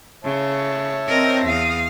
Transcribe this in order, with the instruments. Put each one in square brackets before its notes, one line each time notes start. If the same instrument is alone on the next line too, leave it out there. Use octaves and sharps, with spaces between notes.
[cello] C#3 [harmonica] C#5 E5 A5
[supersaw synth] C4 A#6 [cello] A#4 D#5
[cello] E2 F5 [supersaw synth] D#6